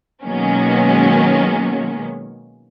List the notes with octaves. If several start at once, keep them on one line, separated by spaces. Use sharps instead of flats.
B2 D#3 F#3 G#3 A#3 C#4